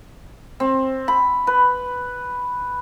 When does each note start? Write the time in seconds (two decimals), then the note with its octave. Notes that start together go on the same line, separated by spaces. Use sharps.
0.60 C4
1.08 B5
1.47 B4